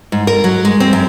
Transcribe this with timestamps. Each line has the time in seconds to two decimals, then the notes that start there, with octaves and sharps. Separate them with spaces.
0.12 G#2
0.27 A#4
0.44 F#3
0.65 G#3
0.80 C4
0.93 F#2